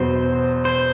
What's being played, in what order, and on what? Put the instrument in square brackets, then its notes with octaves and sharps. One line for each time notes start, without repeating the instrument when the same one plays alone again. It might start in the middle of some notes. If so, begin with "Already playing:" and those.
Already playing: [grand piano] E2 B2 F#3 [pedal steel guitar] C5
[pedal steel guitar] C5